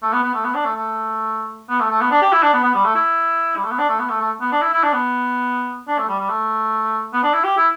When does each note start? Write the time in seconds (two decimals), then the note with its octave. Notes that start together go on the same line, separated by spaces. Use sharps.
0.03 A3
0.13 B3
0.24 B3
0.34 A3
0.44 B3
0.54 D4
0.65 A3
0.76 A3
1.69 B3
1.80 A3
1.90 A3
2.01 B3
2.11 D4
2.22 G4
2.32 E4
2.43 D4
2.53 B3
2.64 B3
2.74 G3
2.85 A3
2.95 E4
3.57 G3
3.64 A3
3.71 B3
3.78 D4
3.89 A3
4.00 B3
4.10 A3
4.21 A3
4.41 B3
4.52 D4
4.62 E4
4.73 E4
4.83 D4
4.93 B3
5.88 D4
5.98 A3
6.09 G3
6.19 G3
6.29 A3
7.13 B3
7.23 D4
7.34 E4
7.44 G4
7.57 E4